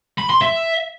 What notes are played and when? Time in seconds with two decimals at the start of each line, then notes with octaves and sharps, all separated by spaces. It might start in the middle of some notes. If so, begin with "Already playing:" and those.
0.18 B5
0.30 C6
0.41 E5